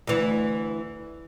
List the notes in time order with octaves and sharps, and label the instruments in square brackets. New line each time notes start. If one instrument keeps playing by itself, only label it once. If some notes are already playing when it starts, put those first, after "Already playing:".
[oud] D2 E3